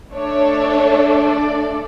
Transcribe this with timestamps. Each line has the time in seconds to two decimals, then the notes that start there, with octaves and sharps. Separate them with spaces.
0.13 A3 D4 A4 C#5
1.18 D5